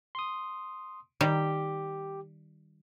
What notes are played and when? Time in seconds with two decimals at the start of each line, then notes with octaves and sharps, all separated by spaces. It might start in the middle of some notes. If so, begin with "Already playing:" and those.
0.15 C6 D#6
1.21 D#3 G3 G4